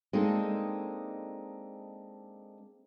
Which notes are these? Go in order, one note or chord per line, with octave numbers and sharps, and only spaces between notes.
G#3 A#3 C4 D4 D#4 A4